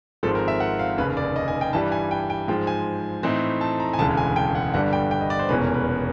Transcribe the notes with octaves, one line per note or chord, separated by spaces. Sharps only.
G#1 G#2 F3 G#3 C4 A4
A#4
E5
F#5
F5
F1 D#2 C#3 B4
D5
D#5
G#5
G5
G2 E3 G3 A5
G#5
G5
G5
G#2 F3 G#3 G5
G#5
A2 E3 A3 C4 D#4
A5
A#5
G#5
E1 D2 C#3 E3 G#3 A5
G#5
G5
F#5
G1 G2 D3 G3 F#5
G5
G5
D#5
D5
C5
F1 E2 B2 G#3 C#4 B4
A#4
B4